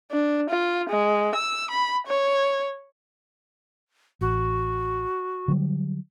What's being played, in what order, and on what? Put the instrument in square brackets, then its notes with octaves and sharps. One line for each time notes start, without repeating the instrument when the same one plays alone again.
[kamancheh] D4
F4
G#3
E6
B5
C#5
[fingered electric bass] A1 [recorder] F#4
[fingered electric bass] D3 F#3 G3